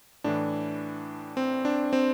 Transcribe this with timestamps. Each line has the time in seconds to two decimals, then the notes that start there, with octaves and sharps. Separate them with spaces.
0.24 A2 E3 D4
1.37 C4
1.65 D4
1.93 C4